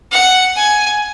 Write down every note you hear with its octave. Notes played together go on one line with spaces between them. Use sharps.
F#5
G#5